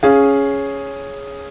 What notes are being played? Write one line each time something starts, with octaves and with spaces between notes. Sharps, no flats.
C#4 G#4 F5